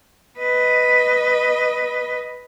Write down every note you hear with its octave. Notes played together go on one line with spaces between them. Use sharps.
B4 D#5